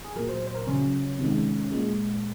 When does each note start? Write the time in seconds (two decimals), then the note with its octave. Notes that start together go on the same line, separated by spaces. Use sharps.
0.05 G#4
0.16 A#2 F#3 A#4
0.28 C5
0.47 C5
0.55 A#4
0.67 C#3 F#3 C#4
1.19 C3 D#3 G#3
1.72 A#2 G#3